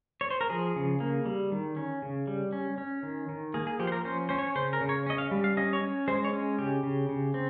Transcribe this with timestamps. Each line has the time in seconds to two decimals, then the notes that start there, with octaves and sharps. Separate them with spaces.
0.21 C#5
0.30 C5
0.41 A#4
0.50 F3 G#4
0.76 C#3
1.00 A#3
1.26 G3
1.52 D#3
1.77 C#4
2.02 C#3
2.27 G3
2.52 C#4
2.78 C#4
3.03 D#3
3.29 D#3
3.54 A#3 G#4
3.67 G#4
3.79 F3 G4
3.87 C5
3.92 A#4
4.05 C#4 C5
4.29 C#4 C5
4.39 C#5
4.55 C#3 C5
4.73 A#4
4.81 C#3
4.89 C#5
5.06 C#4 D#5
5.18 F5
5.31 G3
5.44 F5
5.57 C#4 D#5
5.73 C#5
5.82 C#4
6.08 G#3 C5
6.24 C#5
6.33 C#4
6.59 C#3 G4
6.83 C#3
7.09 C#3
7.34 C4